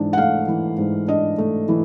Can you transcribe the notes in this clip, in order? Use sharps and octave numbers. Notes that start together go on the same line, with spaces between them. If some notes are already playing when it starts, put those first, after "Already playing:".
Already playing: G#2 E3 D4
F#5
A3 F5
E3
G#2
D4 D#5
A3
E3